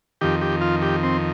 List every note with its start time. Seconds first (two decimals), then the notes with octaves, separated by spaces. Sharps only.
0.21 F2 D#3 G4
0.41 G4
0.61 F4
0.82 G4
1.03 C4